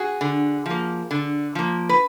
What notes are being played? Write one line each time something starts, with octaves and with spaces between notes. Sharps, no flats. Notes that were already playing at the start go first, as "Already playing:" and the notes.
Already playing: F#4 G#4
D3
F3 A#3
D3
F3 A#3
B4